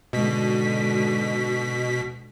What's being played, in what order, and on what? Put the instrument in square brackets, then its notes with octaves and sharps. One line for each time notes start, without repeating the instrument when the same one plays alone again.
[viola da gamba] G#2 D3 [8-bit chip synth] B2 B6